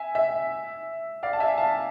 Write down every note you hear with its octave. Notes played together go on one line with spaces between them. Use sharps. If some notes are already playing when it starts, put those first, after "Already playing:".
Already playing: E5 G#5
E5
D5 F5
A5
E5 G#5
F5 A5